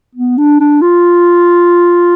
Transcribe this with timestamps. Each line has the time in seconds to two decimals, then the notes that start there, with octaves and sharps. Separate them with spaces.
0.16 B3
0.38 D4
0.60 D4
0.82 F4